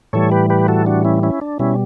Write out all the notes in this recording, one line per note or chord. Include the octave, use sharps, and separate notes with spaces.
A2 E3 G3 A4 C#5
G4 B4
G4 B4
F#4 A4
D4 F#4
C#4 E4
C#4 E4
D4
B2 G3 C#4 E4